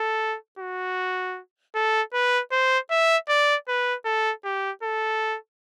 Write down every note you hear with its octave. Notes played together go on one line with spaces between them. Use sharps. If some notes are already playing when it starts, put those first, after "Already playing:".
Already playing: A4
F#4
A4
B4
C5
E5
D5
B4
A4
G4
A4